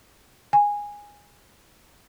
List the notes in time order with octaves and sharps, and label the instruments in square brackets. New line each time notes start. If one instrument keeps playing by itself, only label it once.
[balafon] G#5